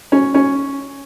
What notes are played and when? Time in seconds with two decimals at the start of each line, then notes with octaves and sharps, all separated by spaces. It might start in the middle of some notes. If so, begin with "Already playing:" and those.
0.12 C#4
0.34 C#4